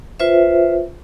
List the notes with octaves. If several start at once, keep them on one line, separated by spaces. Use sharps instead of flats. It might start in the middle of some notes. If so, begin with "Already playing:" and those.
F4 B4 C5 E5